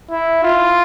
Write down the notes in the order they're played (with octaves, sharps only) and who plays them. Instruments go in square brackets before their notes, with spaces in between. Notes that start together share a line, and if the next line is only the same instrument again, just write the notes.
[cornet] E4
F4